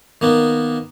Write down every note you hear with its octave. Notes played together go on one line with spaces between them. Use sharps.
D#3 A#3 B3